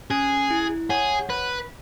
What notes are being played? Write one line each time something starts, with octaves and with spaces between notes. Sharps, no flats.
C#4 G#4
E4
G#4 C#5 F#5
B4